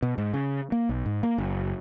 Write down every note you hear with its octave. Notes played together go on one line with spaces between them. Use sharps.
B2
G#2
C#3
A#3
B1
G#2
A#3
F#1